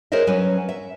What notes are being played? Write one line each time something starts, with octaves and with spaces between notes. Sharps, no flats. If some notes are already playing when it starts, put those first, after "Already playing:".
G#4 A#4 C5 C#5 D#5 E5
F#3 C#4 B4
E5